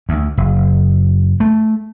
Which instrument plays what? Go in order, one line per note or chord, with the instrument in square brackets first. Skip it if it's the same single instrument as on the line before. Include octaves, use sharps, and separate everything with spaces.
[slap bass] D2
F#1
A3